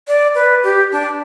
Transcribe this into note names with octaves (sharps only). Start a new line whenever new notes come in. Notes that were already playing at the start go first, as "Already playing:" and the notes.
D5
B4
G4
D4